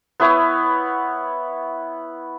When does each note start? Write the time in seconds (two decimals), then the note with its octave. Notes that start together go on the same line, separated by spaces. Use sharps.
0.20 B3 E4 B4 C#5